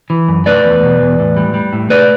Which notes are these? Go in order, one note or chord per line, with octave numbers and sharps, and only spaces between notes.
E3
F#2
A3 B4 D5
E2
B2
E2
A2
G3
G3
A2
A3 B4 D5